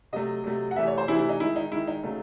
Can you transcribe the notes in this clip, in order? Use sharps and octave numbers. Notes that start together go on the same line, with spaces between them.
C3 F#3 A3 D#5
C3 F#3 A3
F#5
C3 E3 A3 E5
C#5
C5
C3 E3 A3 E4
E4
D#4
D#3 G#3 E4
D#4
D#3 G#3 E4
D#4
C#3 F#3 A3